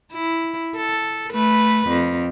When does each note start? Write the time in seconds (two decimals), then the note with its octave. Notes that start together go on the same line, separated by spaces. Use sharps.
0.12 E4
0.77 A4
1.31 A3 B4
1.88 F2